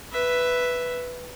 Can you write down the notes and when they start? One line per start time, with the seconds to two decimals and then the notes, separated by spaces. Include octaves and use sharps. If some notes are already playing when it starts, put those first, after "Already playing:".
0.12 B4 E5